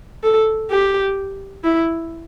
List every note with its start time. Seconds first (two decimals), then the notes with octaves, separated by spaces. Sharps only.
0.23 A4
0.70 G4
1.64 E4